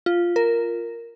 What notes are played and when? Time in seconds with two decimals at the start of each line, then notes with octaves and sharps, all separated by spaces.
0.06 F4
0.36 A#4